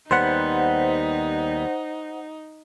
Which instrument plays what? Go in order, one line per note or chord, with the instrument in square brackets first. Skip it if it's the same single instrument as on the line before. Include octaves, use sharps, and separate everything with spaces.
[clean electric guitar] D#2 G3 B3 [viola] D#4 [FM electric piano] C5 F#5